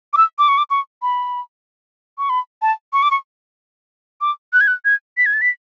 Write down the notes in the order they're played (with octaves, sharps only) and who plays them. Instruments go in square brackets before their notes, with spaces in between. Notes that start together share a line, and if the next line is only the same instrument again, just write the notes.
[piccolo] D6
E6
D6
C#6
D6
C#6
B5
C#6
B5
A5
C#6
D6
C#6
D6
F#6
G#6
F#6
G#6
B6
G#6
A6
B6